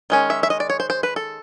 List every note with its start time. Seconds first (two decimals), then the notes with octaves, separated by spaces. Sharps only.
0.10 D#3 G#3 C#4
0.30 E5
0.43 E5
0.50 D#5
0.60 D5
0.70 C#5
0.80 C5
0.90 C5
1.03 B4
1.16 A4